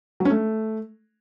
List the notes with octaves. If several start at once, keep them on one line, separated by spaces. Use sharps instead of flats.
F#3
C#4
A3